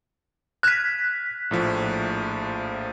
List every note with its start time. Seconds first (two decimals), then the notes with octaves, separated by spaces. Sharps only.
0.63 F6 F#6 G#6 B6 E7
1.51 A#1 A2 F3